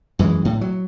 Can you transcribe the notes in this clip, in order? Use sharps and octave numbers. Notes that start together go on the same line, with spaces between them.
F#2 E3 G3 G#3
A2
F#3